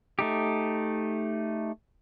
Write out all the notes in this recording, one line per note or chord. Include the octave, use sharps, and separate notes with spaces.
A3 D#4 G4